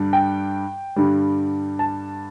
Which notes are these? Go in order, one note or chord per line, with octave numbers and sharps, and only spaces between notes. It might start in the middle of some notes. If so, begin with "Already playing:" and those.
Already playing: G2 D3 G3
G5
G2 D3 G3
A5